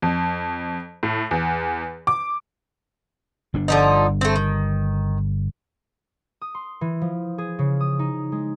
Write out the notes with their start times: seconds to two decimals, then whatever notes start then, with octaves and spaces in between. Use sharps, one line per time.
0.02 F2
1.03 A2
1.31 E2
2.07 D6
3.54 G1 G3 D4
3.68 D3 F3 D#4
4.21 A3 C4
4.36 D#3
6.41 D#6
6.55 C6
6.81 E3
7.01 F3
7.38 G#4
7.59 C#3
7.81 D#6
7.99 D#4
8.32 G#3